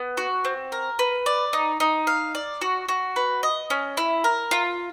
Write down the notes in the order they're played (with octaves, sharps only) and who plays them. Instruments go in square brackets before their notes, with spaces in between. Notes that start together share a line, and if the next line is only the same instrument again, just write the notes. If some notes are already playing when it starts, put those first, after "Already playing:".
Already playing: [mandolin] B3
F#4
C4
A#4
B4
D5
D#4
D#4
F5
D5
F#4
F#4
B4
D#5
C#4
E4
A#4
F4